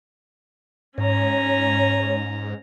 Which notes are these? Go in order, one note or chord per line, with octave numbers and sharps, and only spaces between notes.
G#2 C#4 C#5 A#5